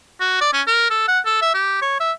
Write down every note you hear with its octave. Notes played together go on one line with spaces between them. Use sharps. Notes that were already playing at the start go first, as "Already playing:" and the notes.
F#4
D5
C#4
A#4
A4
F#5
A4
E5
G4
C#5
E5